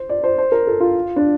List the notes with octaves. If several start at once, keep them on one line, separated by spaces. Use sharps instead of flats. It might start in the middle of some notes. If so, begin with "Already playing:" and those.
Already playing: C5
D5
C5
C5
A#4
A4
F4
D4